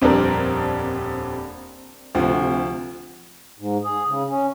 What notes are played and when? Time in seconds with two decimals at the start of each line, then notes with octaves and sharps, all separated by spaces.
0.01 D#1 F2 G3 C4 D4 A#4
2.15 D2 C3 F3
3.59 G#2
3.84 G#4
4.07 C#3
4.29 C#4